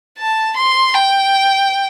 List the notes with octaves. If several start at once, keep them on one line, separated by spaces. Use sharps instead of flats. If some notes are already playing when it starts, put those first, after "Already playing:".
A5
C6
G5